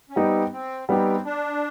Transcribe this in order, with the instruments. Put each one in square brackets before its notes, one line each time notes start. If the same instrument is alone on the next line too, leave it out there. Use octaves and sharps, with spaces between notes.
[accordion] C#4
[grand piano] G3 B3 D#4 G4 [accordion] C4
[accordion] C4
[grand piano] G3 B3 D#4 G4 [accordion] C4
[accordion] D4